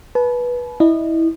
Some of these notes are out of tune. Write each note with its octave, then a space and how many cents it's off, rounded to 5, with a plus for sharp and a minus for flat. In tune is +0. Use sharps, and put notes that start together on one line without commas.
B4 -15 A5 -40
E4 -20 D#5 -30